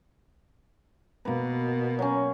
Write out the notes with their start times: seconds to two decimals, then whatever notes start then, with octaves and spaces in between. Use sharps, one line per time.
1.25 B2 A#3 B4
1.99 F#3 C#4